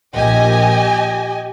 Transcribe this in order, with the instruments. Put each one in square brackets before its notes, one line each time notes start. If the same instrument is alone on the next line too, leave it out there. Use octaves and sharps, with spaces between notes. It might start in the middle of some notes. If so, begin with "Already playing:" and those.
[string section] A#1 [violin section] G4 D#5 G#5